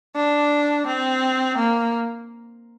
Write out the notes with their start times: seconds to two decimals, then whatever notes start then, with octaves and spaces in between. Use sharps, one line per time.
0.16 D4
0.87 C4
1.58 A#3